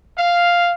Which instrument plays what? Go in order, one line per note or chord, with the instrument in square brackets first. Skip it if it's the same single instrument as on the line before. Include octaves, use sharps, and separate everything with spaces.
[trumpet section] F5